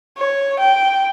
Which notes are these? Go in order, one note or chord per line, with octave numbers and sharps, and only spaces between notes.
C#5
G5